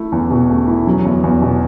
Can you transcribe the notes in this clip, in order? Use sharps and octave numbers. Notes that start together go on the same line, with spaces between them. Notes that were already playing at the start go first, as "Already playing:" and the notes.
Already playing: A3 E4
E2
B2
A3
E4
F#3
E2
E2
B2